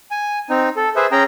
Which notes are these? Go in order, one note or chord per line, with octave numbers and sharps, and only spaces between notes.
G#5
C4 D#4
A4
G#4 B4 C5 E5
C#4 G#4 G5 A#5